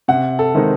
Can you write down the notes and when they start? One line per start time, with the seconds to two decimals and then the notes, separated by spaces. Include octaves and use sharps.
0.08 C3 F#5
0.39 A4
0.55 D#3 G#3 C4 D#4